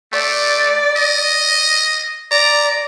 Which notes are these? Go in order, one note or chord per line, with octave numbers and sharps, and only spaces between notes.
A3 D5
D#5
D5 A#5